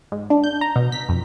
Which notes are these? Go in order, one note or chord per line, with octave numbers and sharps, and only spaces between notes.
G#2
D4
G6
A#5
B2
B6
F2